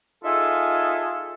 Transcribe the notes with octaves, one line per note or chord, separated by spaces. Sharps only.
D#4 F4 G#4 A4 E5